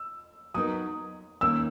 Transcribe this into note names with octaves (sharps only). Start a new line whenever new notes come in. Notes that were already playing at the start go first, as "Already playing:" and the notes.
Already playing: E6
F#3 B3 D#4 A#4 D#6
D#3 A#3 C#4 E6